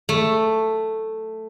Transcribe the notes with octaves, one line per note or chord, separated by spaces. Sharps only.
A3